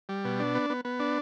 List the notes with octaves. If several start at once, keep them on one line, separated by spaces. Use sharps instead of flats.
G3
B2
D4
B3
B3
B3
D4